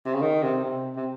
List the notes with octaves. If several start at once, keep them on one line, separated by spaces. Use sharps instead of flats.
C3
C#3
D#3
C3
C3
C3